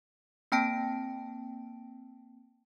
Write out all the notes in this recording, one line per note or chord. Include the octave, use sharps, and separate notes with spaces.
A#3 C4 G5 A5 A#6 D7